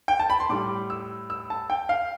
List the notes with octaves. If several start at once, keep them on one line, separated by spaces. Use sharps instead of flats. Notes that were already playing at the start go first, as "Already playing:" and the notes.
G5
A5
B5
C6
A2 G3 D6
E6
E6
A5
G5
F5